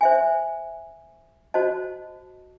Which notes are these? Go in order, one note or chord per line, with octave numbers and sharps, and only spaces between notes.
C5 E5 G#5
F#4 C5 D#5 A5